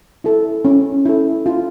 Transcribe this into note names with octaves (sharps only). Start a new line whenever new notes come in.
E4 A4
C#4
E4 A4
F4